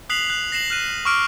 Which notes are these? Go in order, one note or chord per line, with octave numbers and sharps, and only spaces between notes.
D#6 F#6 B6 C7 F7 F#7
F#6
A#6 C7 E7 F#7
F6 F#6 D#7
C#6 D6 E6 F6 D7